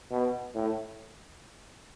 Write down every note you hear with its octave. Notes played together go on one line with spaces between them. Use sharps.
B2
A2